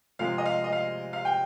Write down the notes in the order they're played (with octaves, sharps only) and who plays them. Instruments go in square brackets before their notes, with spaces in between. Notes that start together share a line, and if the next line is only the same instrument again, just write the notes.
[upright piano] C3 F3 G#3 F5
D#5
F5
D#5
F5
F5
G5